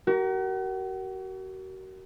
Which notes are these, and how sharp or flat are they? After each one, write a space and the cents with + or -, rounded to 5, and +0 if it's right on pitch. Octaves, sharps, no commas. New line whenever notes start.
F#4 +40 A#4 +0